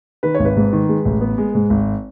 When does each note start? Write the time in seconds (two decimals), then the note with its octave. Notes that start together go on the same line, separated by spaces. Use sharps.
0.23 D#3 B4
0.35 G#1 C#5
0.45 B4
0.57 G#2
0.73 D#3
0.88 G#3
1.05 A1
1.21 B3
1.38 G#3
1.55 G#2
1.70 G#1